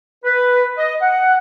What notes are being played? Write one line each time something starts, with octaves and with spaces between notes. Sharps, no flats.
B4
D#5
F#5